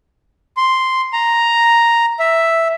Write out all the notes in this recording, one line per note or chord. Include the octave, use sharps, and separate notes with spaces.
C6
A#5
E5